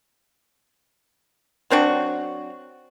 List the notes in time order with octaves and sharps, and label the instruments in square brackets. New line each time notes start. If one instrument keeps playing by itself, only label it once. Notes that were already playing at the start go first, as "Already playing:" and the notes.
[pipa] F#3 C4 D4 F#4